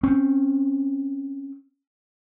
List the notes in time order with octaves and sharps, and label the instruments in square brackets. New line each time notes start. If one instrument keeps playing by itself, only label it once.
[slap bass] C4 C#4